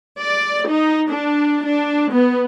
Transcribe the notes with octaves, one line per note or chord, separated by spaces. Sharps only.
D5
D#4
D4
D4
B3